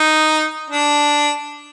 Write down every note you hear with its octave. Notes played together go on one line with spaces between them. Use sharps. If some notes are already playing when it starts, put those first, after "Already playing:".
Already playing: D#4
D4